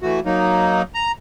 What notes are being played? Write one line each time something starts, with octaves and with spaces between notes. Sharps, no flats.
E3 A3 F#4
F#3 A#3 D#4
A#5